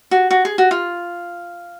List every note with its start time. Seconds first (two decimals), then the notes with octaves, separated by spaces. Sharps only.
0.11 F#4
0.31 F#4
0.45 G#4
0.58 F#4
0.71 F4